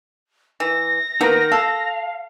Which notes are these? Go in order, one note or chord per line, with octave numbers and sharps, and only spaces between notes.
E3 A#6
A#3 B3 D#4 A#4
A4 F5